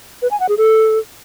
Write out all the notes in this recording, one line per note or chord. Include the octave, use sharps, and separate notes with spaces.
B4
G#5
F#5
G#4
A4